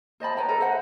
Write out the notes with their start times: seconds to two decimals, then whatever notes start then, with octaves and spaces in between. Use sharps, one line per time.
0.20 C5 D#5 A5 B5
0.37 B4 C#5 G5 A#5
0.49 A4 A#4 A#5
0.60 B4 C5 D#5 F#5